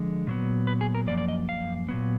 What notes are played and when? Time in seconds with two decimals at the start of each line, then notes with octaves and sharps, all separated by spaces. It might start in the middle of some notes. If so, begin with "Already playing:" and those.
Already playing: D3 F3 G#3
0.27 A#2 F#3 B3
0.67 B4
0.81 G#4
0.95 A#4
1.07 F#2 F3 A#3 D5
1.18 D5
1.28 D#5
1.49 F5
1.89 A#2 F#3 B3